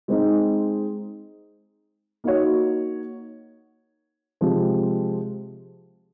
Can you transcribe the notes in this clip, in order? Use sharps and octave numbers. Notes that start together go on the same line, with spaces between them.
G#3 C4 D#4
A#3 D#4 F#4 C#5
C3 F3 G#3 C4